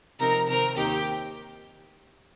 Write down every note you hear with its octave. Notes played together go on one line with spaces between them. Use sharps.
C3 F3 C4 D#4 A#4 A#5
C3 D#3 C4 A#4 A#5
D#2 D#3 C4 D#4 G4 G5